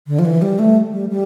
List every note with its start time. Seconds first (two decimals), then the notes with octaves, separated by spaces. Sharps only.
0.07 D3
0.19 F3
0.25 E3
0.42 G3
0.59 A3
0.92 G3
1.09 G3